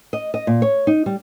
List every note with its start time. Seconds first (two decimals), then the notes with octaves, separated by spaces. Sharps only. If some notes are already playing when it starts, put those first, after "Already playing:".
0.13 D#5
0.34 D#5
0.47 A#2
0.62 C#5
0.87 D#4
1.06 G3